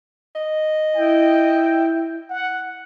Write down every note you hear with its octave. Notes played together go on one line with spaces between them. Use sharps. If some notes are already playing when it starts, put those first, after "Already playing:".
D#5
E4 G5
F#5